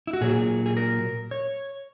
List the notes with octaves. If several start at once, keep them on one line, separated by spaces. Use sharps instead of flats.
E4
F#4
A#2 F#3 G#4
G#4
A#4
C#5